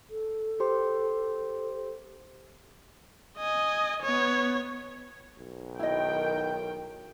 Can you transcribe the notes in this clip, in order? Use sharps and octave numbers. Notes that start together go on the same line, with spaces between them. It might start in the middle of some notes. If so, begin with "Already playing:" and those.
A4
G4 C5 C6
D#5 G#5
B3 C#5
B1
D#3 E4 D#5 G5